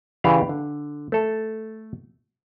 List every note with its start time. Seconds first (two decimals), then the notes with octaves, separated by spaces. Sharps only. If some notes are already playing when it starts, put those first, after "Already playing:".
0.24 C#3 E3 G4 D5 F5
0.49 D3
1.12 A3 A4